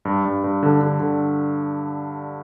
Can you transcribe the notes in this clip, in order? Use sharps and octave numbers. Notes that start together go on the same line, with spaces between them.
G2
G2
G2
D3
D3
D3